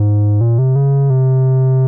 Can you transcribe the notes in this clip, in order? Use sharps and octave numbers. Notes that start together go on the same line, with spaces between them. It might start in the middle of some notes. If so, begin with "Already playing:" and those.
Already playing: G#2
A#2
C3
C#3
C3